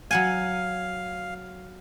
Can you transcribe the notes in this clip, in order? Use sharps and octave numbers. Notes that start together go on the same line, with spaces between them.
F#3 F5 F#5 G#5